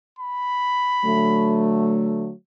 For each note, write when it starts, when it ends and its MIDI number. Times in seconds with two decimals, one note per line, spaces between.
0.19 1.71 83
1.05 2.32 50
1.05 2.32 54
1.05 2.32 57